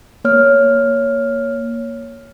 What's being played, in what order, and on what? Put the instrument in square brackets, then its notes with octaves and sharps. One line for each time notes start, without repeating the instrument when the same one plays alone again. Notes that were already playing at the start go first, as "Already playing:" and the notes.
[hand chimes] A#3 C#5 F6